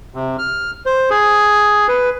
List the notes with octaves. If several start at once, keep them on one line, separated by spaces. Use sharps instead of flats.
C3
F6
C5
G#4
B4